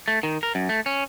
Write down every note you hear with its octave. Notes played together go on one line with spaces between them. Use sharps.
A3
D#3
A#4
F#2
A3
C#4